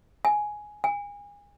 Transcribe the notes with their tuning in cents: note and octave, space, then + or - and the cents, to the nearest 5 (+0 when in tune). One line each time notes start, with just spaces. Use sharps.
G#5 +10
G#5 -30